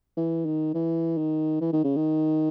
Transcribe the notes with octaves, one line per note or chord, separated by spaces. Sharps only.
E3
D#3
E3
D#3
E3
D#3
C#3
D#3